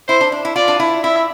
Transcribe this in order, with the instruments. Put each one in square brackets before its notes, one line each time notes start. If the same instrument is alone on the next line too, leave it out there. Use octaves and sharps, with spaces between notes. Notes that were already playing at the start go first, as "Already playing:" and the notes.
[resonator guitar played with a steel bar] E4 [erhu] C5
[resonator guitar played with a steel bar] D4
D4
E4
[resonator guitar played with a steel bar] F4 [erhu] D5
[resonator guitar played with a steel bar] D4
E4
[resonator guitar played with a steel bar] E4 [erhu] E5